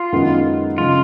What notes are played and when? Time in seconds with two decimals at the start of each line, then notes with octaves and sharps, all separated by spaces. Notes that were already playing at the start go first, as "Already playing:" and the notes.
Already playing: F4
0.13 F#2 D#3 G#3 B3
0.78 C#3 F3 G#3 F4